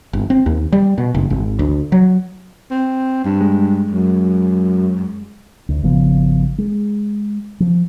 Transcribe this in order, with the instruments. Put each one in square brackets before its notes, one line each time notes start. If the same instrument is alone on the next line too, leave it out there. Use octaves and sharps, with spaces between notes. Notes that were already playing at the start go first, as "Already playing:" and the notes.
[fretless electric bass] G1
C4
D#2
G3
B2
F#1
G#1
D2
F#3
[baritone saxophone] C4
G2
[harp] G#3
[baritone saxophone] F#2
[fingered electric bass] D2
G#1 C#3 F3 B3
G#3
F3